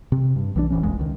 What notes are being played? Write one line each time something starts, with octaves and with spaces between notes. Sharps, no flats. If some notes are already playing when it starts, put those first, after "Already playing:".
C3
G2
B1 E3 F3 D4
D1 A1 E3 C#4
F1 A#1 F2 G#3
C#2 D#3